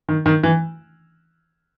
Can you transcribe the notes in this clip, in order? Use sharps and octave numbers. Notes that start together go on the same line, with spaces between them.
D#3
D#3
E3